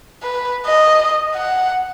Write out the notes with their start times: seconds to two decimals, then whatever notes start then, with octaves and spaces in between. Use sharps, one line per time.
0.23 B4
0.66 D#5
1.35 F#5